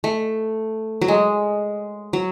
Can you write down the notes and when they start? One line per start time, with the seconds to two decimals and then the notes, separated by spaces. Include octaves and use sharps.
0.04 A3
1.01 F#3
1.08 G#3
2.13 F#3